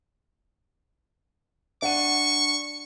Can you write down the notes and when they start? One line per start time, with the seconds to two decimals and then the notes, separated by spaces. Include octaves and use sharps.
1.82 D4 F#5 C#6 D#7